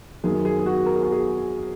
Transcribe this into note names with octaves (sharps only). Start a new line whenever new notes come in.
F#2 D#3 A#3 G#4
G#4
G#4
F#4
A#4
G#4
F#4
G#4